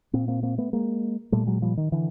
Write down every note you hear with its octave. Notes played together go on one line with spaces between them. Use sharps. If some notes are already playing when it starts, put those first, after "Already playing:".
A#2 A#3 C4
A#3 C4
A#3 C4
A3 B3
G#3 A#3
A#2 G3 A3
F#3 G#3
F3 G3
D#3
D3 E3